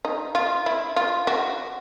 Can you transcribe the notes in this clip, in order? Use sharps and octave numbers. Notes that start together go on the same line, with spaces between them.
D#4
F4
E4
F4
F#4